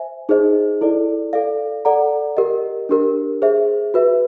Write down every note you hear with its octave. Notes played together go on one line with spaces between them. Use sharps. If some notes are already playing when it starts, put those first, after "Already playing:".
Already playing: C5 E5 G#5
D#4 G#4 C5 D#5
E4 A4 D5
A4 D5 F5
A4 D5 F#5 A#5
G4 A#4 D#5
D4 G4 A#4
G#4 C5 E5
F#4 B4 E5